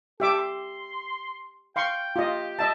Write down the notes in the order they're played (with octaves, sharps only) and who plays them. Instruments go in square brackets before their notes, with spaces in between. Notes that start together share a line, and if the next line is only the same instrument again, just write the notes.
[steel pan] G4 E5 D6 [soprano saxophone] A4
[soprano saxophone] C6
[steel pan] F5 C6 C#6 [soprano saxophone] G5
[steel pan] F4 D#5 [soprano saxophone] G4
[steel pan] D#5 E5 A5